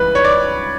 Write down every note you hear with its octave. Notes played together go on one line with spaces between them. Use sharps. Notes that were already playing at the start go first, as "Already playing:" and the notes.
Already playing: C#2 E3 G3 B4
C#5
D5